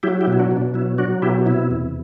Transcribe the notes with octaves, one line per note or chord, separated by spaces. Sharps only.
F#3 E4 G4
E4 G4
B2
E4
D4 F#4
B2
D4
F#3 E4
F#3 D4 F#4
B2 E4 G4
C3 E4
E2